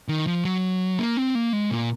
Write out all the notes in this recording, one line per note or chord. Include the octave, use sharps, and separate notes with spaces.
D#3
F3
F#3
A#3
C4
A#3
G#3
A#2